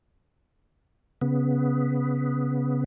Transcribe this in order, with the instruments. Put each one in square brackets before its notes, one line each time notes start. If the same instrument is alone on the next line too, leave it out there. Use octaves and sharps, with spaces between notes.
[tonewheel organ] C#3 B3